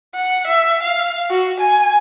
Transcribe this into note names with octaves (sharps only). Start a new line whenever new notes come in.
F#5
E5
F5
F#4
G#5